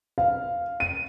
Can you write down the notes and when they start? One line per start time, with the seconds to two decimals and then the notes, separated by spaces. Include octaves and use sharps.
0.18 F5
0.80 D#7